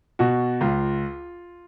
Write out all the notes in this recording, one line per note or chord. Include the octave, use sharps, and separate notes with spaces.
B2 F#4
C#2 F4